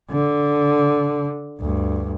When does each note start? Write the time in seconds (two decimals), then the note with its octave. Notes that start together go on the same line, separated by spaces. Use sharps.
0.10 D3
1.60 D2 G2